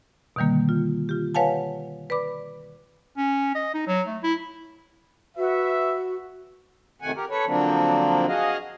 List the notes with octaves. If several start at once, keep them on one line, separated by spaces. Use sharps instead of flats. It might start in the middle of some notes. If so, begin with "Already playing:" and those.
B2 D3 D#3 G3 A#3
F4
F4 G4
B4 C#5 F5 F#5 G#5 A5
B4 D5 B5 D6
C#4
D#5
D#4
F#3
A3
E4
F#4 B4 E5
F2 C3 D#3 A3 F#5 G#5
G4 A#4
A4 B4 C#5
D3 F3 F#3 A#3 C4 D4
F#4 G#4 D#5 F5